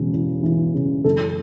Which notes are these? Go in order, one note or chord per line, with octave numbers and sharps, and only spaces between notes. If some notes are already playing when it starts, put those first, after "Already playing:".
Already playing: E1 C#3 E3
E2
E3
C#3
F#1 A4